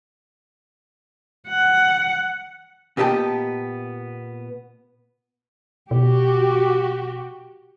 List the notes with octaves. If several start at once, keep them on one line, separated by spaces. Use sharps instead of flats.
F#5
A#2 B3 G4 D#5 G5 A5
B2 F#4 G4